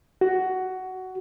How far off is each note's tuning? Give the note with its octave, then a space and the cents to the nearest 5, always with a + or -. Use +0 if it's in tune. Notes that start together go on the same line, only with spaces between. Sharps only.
F#4 +15